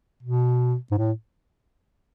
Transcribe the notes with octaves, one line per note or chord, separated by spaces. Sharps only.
B2
G#2
A2